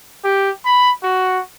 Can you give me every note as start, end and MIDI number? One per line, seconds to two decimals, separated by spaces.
0.24 0.50 67
0.65 0.90 83
1.03 1.40 66